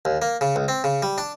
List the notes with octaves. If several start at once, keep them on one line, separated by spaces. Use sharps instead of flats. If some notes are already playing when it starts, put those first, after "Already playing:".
D#2
A#3
C#3
C#2
C4
C#3
G3
D4